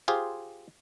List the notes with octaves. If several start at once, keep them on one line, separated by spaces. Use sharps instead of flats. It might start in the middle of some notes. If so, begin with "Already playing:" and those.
F4 G4 G#4 C5